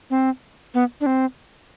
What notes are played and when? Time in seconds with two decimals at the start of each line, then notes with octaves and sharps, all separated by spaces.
0.10 C4
0.74 B3
1.01 D4
1.06 C4